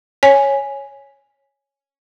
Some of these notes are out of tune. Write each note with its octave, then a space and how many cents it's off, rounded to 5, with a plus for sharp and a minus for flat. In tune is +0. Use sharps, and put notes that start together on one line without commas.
C#5 +0 G#5 +0